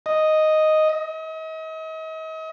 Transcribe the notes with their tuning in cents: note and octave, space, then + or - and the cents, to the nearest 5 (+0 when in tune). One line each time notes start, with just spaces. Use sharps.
D#5 +0
D#5 +40